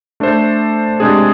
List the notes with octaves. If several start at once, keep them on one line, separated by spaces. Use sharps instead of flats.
A3 D4 A4 C5
C3 G#3 D4 G#4